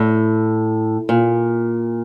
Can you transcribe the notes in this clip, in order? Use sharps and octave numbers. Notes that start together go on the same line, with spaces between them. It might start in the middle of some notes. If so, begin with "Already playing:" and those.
Already playing: A2
A#2